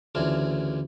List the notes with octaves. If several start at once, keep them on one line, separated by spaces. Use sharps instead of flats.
D2 C#3 E3 D4 F4